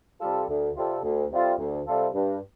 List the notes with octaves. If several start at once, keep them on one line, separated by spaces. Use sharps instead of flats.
C3 G3 F4 A4
D2
C3 G3 F4 A4
D2
C3 G3 F4 A4
D2
C3 G3 F4 A4
G2